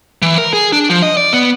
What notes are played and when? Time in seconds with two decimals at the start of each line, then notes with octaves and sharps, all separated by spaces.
0.22 E3
0.38 A#4
0.53 G#4
0.73 D4
0.90 F3
1.03 D#5
1.17 D5
1.33 B3